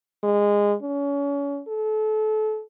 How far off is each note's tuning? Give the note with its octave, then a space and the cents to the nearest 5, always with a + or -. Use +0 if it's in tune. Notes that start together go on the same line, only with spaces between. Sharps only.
G#3 -20
C#4 +35
A4 -30